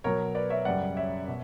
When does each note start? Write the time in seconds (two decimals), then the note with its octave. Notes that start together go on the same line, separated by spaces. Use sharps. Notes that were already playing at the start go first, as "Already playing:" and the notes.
0.04 B2 F#3 A#4 C#5
0.35 B4 D5
0.50 C#5 E5
0.65 F#2 C#3 G3 D5 F#5
0.96 C#5 E5
1.28 B2